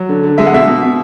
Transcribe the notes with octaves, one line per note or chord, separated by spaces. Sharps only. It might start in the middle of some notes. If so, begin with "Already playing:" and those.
Already playing: F#3
D3
D3
G#3 E5
F#5
B2 E5
B2
B2